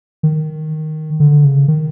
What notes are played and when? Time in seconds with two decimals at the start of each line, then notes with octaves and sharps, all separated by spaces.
0.23 D#3
1.20 D3
1.44 C#3
1.68 D#3